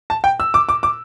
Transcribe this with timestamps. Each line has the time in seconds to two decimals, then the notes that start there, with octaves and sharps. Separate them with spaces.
0.10 A5
0.24 G5
0.40 E6
0.54 D6
0.69 D6
0.83 D6